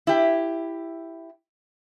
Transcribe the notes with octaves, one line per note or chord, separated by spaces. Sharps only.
E4 G4